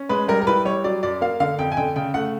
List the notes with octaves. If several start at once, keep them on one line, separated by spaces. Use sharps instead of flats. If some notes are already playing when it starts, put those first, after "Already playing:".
Already playing: C#4
G#3 B4
G3 A#4
A#4
E4 B4
G3 C#5
F#3 D5
F#2 D5
A#3 F5
D3 F5
F2 G5
G#5
D3 G5
C#3 G5
A3 F#5